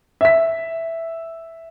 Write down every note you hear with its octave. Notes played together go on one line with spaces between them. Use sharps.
E5 B6